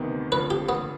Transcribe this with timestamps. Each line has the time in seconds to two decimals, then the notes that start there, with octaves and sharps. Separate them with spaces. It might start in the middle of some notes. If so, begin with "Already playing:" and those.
Already playing: D2 C3 D#3 B3
0.32 F2 D3 F3 B4
0.50 G4
0.69 B3